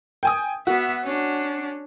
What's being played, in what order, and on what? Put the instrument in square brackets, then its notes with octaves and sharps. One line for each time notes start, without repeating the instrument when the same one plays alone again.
[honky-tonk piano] G5 G#5 D#6
[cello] B3 E5 [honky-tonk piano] F#4
[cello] C#4 D4